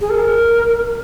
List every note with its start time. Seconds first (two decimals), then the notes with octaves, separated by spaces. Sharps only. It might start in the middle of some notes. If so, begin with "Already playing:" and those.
0.01 G#4
0.10 A#4